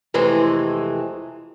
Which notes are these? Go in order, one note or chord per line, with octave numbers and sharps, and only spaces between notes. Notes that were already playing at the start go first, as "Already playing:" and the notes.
F2 C3 E3 G#3 A3